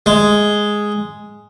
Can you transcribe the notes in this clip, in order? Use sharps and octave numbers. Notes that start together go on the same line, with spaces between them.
G#3